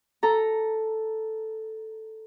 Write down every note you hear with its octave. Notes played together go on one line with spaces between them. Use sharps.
A4 A#5